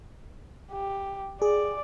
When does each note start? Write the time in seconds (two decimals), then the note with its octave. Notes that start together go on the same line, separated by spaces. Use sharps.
0.71 G4
1.42 G#4 D5